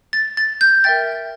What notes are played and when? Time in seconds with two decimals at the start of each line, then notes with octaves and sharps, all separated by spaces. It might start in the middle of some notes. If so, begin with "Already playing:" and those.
0.13 A6
0.37 A6
0.61 G6
0.84 A#4 E5 G5 A6